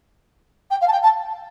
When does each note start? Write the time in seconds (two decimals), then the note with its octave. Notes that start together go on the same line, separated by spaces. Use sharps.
0.71 G5
0.81 F5
0.88 A5
0.92 G5
1.03 A5